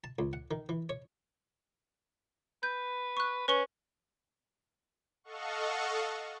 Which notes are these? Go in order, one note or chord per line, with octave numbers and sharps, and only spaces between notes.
A5
C#2
F#5
D#3
E3
C#5
B4 G6
C#6 F#6
C#4 B4 C#6 G7
A4 D#5 F5 F#5 C#6